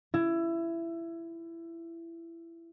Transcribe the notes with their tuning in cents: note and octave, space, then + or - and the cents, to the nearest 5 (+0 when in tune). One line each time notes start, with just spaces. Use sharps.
E4 +20